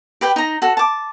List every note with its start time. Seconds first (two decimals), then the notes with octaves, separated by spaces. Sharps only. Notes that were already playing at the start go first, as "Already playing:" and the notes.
0.21 G4 B4 G5
0.36 D#4 A#5
0.62 F#4 A4
0.77 A5 D6